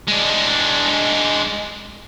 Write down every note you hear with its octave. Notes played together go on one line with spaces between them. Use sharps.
G#3 D4